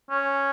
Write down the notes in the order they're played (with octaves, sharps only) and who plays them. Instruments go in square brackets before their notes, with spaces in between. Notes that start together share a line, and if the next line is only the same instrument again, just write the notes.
[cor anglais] C#4